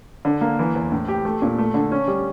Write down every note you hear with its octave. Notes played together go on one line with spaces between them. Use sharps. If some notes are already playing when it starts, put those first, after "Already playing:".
D3
A#3
E3
E2
A2
G4
A3
A#2
A3
D3
C#4
G3